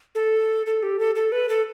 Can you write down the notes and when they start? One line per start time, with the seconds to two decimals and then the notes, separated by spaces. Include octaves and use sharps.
0.15 A4
0.66 A4
0.83 G4
0.99 A4
1.15 A4
1.32 B4
1.49 A4